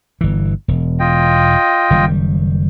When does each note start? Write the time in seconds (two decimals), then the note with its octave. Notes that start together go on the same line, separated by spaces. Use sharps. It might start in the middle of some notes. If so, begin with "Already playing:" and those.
0.21 G1 E3
0.68 E1
1.00 F4 D#5 G5
1.90 F#1 D#3 G3